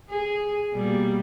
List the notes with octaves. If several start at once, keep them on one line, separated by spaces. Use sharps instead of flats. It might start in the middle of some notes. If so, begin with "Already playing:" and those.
G#4
B2 G3 A#3